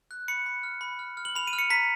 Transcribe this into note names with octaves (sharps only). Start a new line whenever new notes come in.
F#6
B5 C#7
B5
F6
B5
F6
F6
F#7
B5 F7
D#7
F6
C#7
A#5 B6